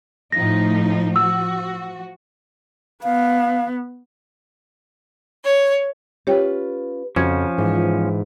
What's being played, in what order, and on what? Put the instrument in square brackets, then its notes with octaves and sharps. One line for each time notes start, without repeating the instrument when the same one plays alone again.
[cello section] A2 F3 D#4 [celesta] A#6
[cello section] F3 F#4 [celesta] E6
[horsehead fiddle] B3 [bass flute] F5
[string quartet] C#5
[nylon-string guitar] C#4 F4 B4 [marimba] G4 C#5 G5
[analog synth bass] F2 [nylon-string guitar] C#3 F#4 [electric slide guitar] F3 C#4 [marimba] G#6
[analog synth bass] G#2 [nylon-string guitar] E3
[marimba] F4